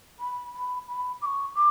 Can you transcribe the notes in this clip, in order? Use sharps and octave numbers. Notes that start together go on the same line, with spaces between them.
B5
B5
B5
D6
C#6
D6